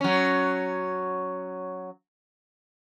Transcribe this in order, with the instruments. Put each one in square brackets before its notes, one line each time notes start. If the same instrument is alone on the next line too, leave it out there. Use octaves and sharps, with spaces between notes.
[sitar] F#3 C#4